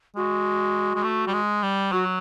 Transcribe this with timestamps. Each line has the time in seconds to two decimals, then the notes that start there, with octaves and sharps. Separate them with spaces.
0.16 G#3 F#4
0.95 G#3
1.04 A3
1.27 G3
1.33 G#3
1.63 G3
1.92 F#3 F#4